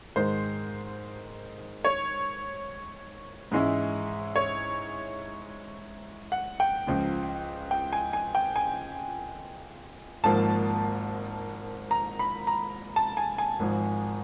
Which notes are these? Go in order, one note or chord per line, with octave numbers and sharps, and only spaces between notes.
G#2 D#3 G#3 C5
C#5
G#2 E3 G#3 C#4 E4
C#5
F#5
G5
C#2 C#3 F3
G5
G#5
G#5
G5
G#5
G#1 G#2 F3 A#3 A5
A#5
B5
A#5
A5
G#5
G#5
G#1 G#2 F3